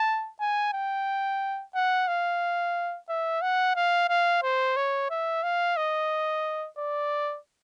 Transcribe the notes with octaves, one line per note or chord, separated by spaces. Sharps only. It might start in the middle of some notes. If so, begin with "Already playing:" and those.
Already playing: A5
G#5
G5
F#5
F5
E5
F#5
F5
F5
C5
C#5
E5
F5
D#5
D5